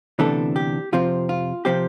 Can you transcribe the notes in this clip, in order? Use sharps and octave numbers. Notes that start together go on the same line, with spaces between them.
D2 C3 E3 B3 D4 A4
G4
F2 C3 F3 C4 F4
F4
C3 F3 C4 G4